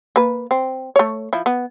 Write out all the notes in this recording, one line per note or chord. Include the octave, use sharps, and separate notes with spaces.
A#3 B4
C4
A3 C#5
F3 E4
B3